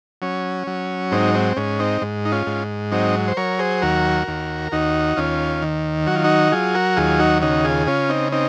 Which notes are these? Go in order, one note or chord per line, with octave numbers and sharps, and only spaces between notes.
F#3 C#4
F#3
G#2 C4 D#4
C4
G#2 C#4
C4 D#4
G#2
D#4
C#4 F4
G#2
F#3 C4 D#4
C5
F#3 A#4 C#5
G#4 C5
D#2 F#4 A#4
D#2
D#2 D#4 F#4
D#2 C#4 F4
D#3
F#3 F#4
F4
D#4 F#4
F#3 F4 G#4
F#4 A#4
D#2 F4 G#4
D#4 F#4
C#3 D#4 F#4
F4 G#4
C#3 C#4 F4
C4 D#4
C4 D#4